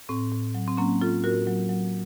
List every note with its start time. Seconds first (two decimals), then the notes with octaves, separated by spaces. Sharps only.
0.09 A2 C4
0.32 A2
0.55 F#3
0.68 C4
0.77 F#3 A#3 C#4
1.01 A2 F4 A4
1.24 A2 F#4 A#4
1.47 F#3
1.69 F#3